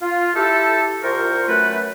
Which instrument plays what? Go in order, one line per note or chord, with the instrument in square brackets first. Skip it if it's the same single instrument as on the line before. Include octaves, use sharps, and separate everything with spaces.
[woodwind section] F4
E4 G4 A4
C2 C3 F4 A#4 C5 C#6
F#2 A3 B4